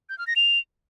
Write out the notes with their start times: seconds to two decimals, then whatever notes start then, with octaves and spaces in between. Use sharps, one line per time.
0.09 G6
0.18 F6
0.27 A#6
0.36 F7